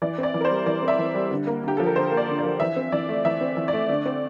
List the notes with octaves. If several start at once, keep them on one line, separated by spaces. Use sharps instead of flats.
E3 D5
C4 D5
E3
A#4
C5
G3
E3 D5
C4
E5
E3
G3
D3
A#3
D3 G4
F3 A4
A#4
D3 C5
A#3
D5
D3
D5
F3
E3 E5
C4
E3 D5
A3
E3 E5
C4
E3
D5
A3
D3
C4